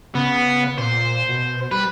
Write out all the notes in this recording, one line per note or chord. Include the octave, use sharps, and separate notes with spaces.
C#3 B3
A#2 C5
B2
G3 B4